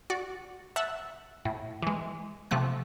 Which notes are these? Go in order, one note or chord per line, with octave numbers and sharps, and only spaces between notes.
F#4 D5
E5 F#5 A5 B6
A2
E3 G#3
C3 F3 A3 F#6